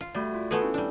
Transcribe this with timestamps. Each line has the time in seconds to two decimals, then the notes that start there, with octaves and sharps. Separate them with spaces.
0.01 F4
0.15 G3 A3 F#4 D5
0.30 F4 F#4
0.51 A3 B3 G#4 A4
0.62 C#4 E4
0.74 G3 D4